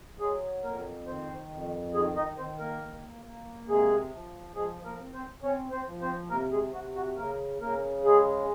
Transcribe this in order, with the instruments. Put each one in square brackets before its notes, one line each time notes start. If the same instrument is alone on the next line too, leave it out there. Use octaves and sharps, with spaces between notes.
[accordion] F#3 G#3 G#4
F2 A#3 A#4
D#3 C4 C5
F2
D#3 G#3 G#4
D#4 D#5
D#3 C4 C5
A#3 A#4
A#3
A#3
C3 G#3 G#4
F3
F3 G#3 G#4
A#3 A#4
C4
C4 C5
C4 C#4 C#5
C4 C5
F3
C4 C5
C3 A#3 A#4
G#3 G#4
C3 F#4
F#4
C#3 A#3 A#4
C#3 A#3 A#4
G#3 G#4